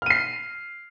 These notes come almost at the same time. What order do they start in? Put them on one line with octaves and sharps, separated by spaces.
F6 D#7 C7